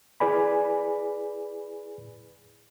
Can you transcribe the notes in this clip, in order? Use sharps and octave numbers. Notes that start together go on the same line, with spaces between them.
E4 G#4 B4 D5 G#5 B5